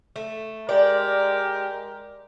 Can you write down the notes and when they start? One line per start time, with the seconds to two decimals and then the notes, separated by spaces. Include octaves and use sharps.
0.16 A3
0.69 G#3 G4 A#4 D5